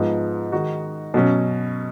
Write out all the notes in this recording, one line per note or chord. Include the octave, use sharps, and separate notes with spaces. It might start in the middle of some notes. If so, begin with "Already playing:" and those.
Already playing: G#2 F3 G#3 B3 D#4
D#3 G#3 D#4 F#4
B2 F#3 C#4